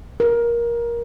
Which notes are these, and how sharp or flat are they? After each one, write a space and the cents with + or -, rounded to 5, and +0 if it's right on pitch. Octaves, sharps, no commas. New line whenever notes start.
A#4 +15